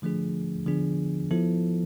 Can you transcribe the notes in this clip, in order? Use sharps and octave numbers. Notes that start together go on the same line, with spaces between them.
D3 F3 A3 D4 G#4
D3 F3 B3 D4 G#4
F3 B3 E4 A4